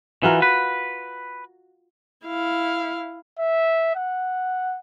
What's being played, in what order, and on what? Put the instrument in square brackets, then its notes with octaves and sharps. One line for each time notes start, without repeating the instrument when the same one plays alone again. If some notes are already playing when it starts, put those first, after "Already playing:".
[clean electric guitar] E3 [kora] F4 F#4 A#4
[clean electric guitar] B4
[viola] E4 F5
[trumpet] E5
F#5